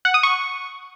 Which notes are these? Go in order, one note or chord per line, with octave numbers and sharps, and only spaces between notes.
F#5
D#6
C#6